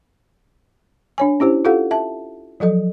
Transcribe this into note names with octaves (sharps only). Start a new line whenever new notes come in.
D4 C#5 G#5
C#4 E4 G4 C5
F4 G4 A4 F5 F#5
E5 A5
F3 F#3 A4 D#5